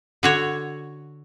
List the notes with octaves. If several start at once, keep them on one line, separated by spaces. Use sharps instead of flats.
D3 F#4 C#5